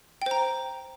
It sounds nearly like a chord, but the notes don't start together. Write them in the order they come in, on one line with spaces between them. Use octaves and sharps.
G5 C5 A#5